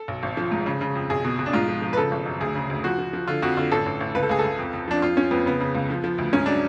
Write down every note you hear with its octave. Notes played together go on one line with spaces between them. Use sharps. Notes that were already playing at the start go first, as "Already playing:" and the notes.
Already playing: A4
B1
G#1
F3
G#2
C#3
C#3
F2
B1 G#4
B2
B2
D4
G#2 F4
F3
F3
B4
C#3 A4
G#1
F#2
D2 G#4
C#3
D2
F3 F#4
F3
F3
D3 F4
F2 F#4
D3 F4
A1 A4
A1
A1
C#2 B4
A4
C#2 G#4
A4
C#2
F2
F2
F3 D4
F2 F4
F3 C#4
F2 B3
C#3 B3
C#3
C#2
F3
F3
D2
G#2 C#4
F#3 D4